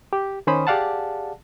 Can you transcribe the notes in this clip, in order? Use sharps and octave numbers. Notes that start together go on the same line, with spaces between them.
G4
D#3 C#4 C5 B5 D#6
G4 G#4 D5 F5 F#5 A5